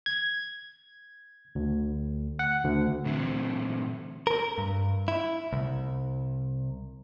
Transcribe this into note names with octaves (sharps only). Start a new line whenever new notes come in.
G#6
D2
F#5
D2
A#2 D3 E3 F#3 A3 C4
A#4
G2
E4
C2